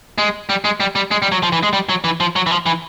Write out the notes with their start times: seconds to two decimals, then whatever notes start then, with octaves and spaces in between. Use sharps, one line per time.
0.18 G#3
0.49 G3
0.65 G#3
0.80 G3
0.95 G3
1.11 G#3
1.22 G3
1.32 F#3
1.43 F3
1.52 E3
1.63 G#3
1.73 G3
1.89 F#3
2.04 E3
2.20 F3
2.36 F#3
2.46 E3
2.51 F3
2.66 E3